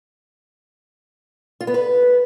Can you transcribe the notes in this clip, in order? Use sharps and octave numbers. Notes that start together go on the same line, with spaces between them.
F4
B3
B4